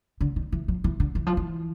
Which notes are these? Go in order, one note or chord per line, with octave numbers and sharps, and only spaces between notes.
D3
D#3
E3
F3
E3
D3
E3
F3
E3